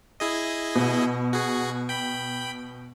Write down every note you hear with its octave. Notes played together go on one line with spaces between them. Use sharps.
E4 G#4 D#5
B2
F#4 G#4
G5 B5